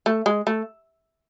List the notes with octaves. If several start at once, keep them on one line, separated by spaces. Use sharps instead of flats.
A3
G#3
A3